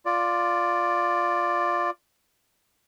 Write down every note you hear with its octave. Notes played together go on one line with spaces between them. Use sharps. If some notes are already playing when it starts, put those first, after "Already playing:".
F4 D5